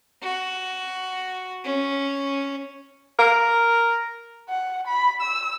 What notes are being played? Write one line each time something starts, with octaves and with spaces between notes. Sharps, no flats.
F#4
C#4
A#4
F#5
B5
E6